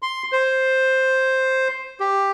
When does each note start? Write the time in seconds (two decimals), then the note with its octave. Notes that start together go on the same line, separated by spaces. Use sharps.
0.02 C6
0.32 C5
2.00 G4